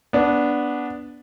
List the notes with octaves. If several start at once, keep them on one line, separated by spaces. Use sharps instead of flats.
B3 D4